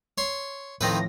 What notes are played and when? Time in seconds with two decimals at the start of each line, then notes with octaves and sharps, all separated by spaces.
0.18 C#5 C6
0.81 A2 D#3 F3 C4 B4 A#6